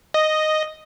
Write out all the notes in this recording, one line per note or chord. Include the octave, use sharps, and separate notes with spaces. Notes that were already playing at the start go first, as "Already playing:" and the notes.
D#5